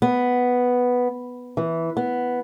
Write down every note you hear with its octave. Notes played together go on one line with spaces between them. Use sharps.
B3
E3
B3